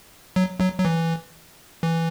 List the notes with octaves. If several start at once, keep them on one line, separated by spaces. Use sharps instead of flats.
F#3
F#3
F#3
E3
E3